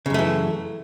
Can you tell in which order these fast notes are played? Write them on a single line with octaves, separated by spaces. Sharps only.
C#3 F#2 A3 E3